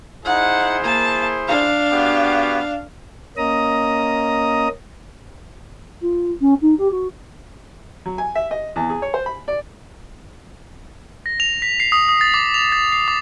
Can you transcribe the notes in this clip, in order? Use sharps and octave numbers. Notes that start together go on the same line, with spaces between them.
D#4 E4 G#4 C5 F#5
A#3 A5
D4 F5
B3 F#4 G4
A#3 C#4 D#5 A#5 D#6
F4
C#4
D#4
G4
F#4
F#3
G#5
E5
D#5
E2
G#4
C#5
C5
B5
D5
A#6
F7
B6
C7
D#6
D#6
A6
D6
F7
A6
C7
D6